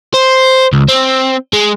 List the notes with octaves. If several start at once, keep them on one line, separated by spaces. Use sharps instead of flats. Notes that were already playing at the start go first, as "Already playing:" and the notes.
C5
C#2
C4
G#3